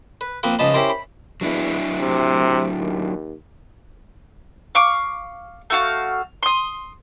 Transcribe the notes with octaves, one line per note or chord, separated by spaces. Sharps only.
B4
F3 A#3 C4 B4
C#2 G#2 F3 D#5 A5 B5
C#4 E4 G4 A#4 C5
B5
E2 F#3 D4 E4
C3
D#2
F5 C#6 D6
A3 F#4 F5
C6 D#6